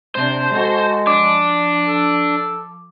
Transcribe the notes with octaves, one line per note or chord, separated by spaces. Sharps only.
C3 D4 C5
G#3 F#4 A4
F3 D4 D6
A4